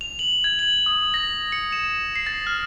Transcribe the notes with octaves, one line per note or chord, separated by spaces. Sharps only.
F7
F#7
G#6
F#7
D#6
A#6
C#7
E7
C7
A6
F6